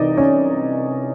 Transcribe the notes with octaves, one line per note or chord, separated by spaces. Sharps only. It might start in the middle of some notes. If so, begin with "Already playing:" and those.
Already playing: C2 C3 E3 D#4 D5 D#5
C#4 C#5